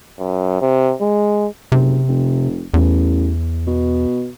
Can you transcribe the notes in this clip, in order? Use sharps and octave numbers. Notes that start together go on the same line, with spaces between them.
F#2
C3
G#3
F#1 C3
F1
A1 E2
B2